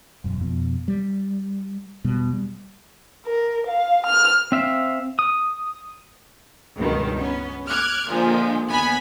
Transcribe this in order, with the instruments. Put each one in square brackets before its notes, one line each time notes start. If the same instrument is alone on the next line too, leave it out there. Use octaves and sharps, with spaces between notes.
[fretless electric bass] E1 F#2
F2 B2
G3
E1 B2 G3
G3
[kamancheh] A#4
F5
F6
[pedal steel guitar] C4 E5 F5
D#6
[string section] C#2 G2 B2 D#3
B3 C#4
D6 F6 F#6 G#6
A#2 D3 F3 G#3
D#2 B3 G#5 B5